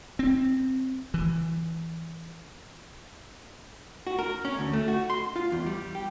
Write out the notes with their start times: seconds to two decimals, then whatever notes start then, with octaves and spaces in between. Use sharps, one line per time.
0.19 C4
1.14 E3
4.07 F#4
4.19 A#4
4.45 C#4
4.59 D2
4.73 A3
4.88 F#4
5.10 C6
5.36 F4
5.52 E2
5.66 G3
5.95 G4